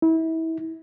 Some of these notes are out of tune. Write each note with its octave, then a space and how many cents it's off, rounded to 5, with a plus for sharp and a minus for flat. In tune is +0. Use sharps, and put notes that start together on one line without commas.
E4 -30